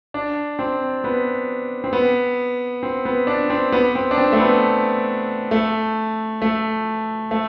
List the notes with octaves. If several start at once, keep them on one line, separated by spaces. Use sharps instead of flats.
D4
C4
B3
C4
B3
C4
B3
D4
C4
B3
C4
D4
C4
A3
B3
A3
A3
A3